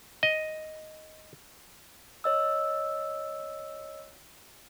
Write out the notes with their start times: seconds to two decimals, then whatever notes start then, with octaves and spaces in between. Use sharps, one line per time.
0.23 D#5
2.24 C#5 D#5 E6